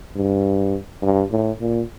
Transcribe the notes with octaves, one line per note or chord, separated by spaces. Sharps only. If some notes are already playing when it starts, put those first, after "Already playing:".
G2
G2
A2
A#2